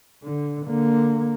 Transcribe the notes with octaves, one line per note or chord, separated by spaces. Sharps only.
D3
D3 A#3